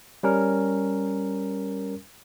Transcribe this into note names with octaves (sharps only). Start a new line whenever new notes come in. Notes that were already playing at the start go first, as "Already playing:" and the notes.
G3 C#4 A#4